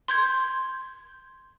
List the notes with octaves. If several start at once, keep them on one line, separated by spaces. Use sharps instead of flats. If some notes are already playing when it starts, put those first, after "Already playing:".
C6 G6 G#6